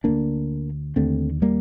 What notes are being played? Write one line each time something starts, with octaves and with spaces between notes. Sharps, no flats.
D2 D3 A#3 D4
D#2 D3 A3 C4
G3 A#3